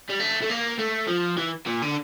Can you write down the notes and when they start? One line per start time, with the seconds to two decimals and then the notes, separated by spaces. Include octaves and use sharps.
0.10 G3
0.20 A3
0.42 A3
0.50 A#3
0.79 A3
1.08 F3
1.38 E3
1.67 A#2
1.82 D3